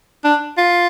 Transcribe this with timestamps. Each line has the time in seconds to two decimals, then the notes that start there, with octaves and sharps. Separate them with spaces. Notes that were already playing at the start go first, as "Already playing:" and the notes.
0.24 D4
0.57 F4